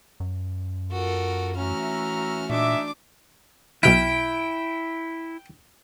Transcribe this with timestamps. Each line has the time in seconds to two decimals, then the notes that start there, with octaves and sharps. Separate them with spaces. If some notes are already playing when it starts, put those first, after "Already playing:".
0.20 F#2
0.92 F4 F#4 A4 A#4
1.57 E3 A3 C#4 F#4 E5 A#5 F6
2.50 A#2 G#3 D4 D#4 E5 D6
3.83 B1 B2 E4 G5 F6